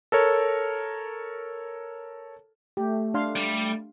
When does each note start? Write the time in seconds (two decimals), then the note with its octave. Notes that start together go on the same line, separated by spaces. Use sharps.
0.12 A4 A#4 C#5
2.77 A3 G4
3.14 D4 F5 C6
3.36 G3